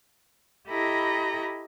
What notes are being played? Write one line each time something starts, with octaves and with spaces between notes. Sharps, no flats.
E4 G4 A4 D#5 A#5 B5